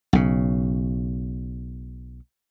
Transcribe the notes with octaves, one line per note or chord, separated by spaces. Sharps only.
B1 C#3